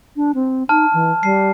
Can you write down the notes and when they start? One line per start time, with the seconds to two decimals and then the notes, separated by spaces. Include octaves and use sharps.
0.17 D4
0.35 C4
0.69 D#4 A5 F6
0.93 E3
1.23 G3 A5 C7